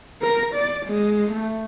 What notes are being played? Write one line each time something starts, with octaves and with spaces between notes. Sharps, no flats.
A#4
D5
G#3
A3